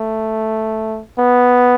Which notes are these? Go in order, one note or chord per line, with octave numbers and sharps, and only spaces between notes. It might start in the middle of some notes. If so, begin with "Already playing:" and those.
Already playing: A3
B3